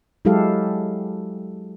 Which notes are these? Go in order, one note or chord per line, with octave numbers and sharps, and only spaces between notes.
F#3 G#3 E4 G4 A4 F5